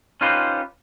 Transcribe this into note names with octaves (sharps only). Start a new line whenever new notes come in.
C#4 D#4 F4 G4 B4 C5